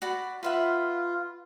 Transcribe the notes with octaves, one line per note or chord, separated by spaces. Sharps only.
F#4 D5 B5
F4 B4 E5 F#5